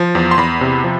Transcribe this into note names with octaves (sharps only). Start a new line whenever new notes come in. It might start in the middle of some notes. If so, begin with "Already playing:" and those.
Already playing: F3
E2
C6
E2 B5
C3
F3